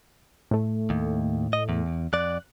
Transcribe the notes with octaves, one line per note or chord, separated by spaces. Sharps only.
A2 A3
D#2
D#5
E2
F2 D5 F#6